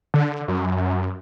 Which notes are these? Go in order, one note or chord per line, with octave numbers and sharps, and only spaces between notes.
D3
F#2